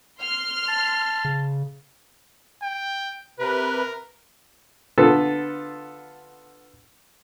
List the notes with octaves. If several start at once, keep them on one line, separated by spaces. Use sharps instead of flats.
C6 F6
A5
C#3
G5
C3 A#4 B4
D3 B3 F4 A4 B4